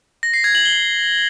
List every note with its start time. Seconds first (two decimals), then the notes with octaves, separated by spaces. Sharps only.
0.23 A#6
0.34 C7
0.44 G#6
0.55 F#7
0.65 G7